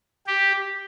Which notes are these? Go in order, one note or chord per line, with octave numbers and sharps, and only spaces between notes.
G4